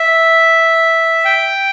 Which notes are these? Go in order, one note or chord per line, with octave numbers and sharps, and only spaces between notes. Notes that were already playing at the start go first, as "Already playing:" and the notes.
Already playing: E5
G5